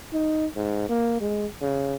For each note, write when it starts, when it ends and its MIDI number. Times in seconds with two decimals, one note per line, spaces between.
0.13 0.46 63
0.56 0.85 44
0.89 1.20 58
1.21 1.46 56
1.62 1.95 49